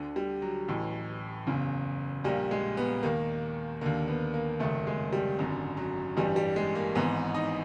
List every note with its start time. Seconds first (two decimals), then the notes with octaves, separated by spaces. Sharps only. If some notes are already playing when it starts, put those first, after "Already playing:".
Already playing: D2 D3
0.16 G3
0.42 F#3
0.68 A1 A2 E3
1.47 F#1 E2 C#3
2.24 A#1 A#2 G3
2.51 G#3
2.77 B3
3.03 D#2 D#3 A#3
3.81 D#2 D3 A#3
4.08 B3
4.34 A#3
4.60 F#1 F2 C3 D#3 A3
4.87 G#3
5.13 G3
5.39 G#1 F#2 D3
5.77 F#3
6.17 A1 G2 E3 G3
6.36 G3
6.56 G#3
6.75 A#3
6.95 G#1 G#2 E3 B3
7.34 D#4